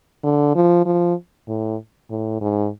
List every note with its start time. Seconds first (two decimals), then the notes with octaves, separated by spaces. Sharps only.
0.23 D3
0.55 F3
0.86 F3
1.48 A2
2.10 A2
2.41 G#2